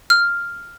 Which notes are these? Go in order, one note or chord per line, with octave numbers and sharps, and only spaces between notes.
F6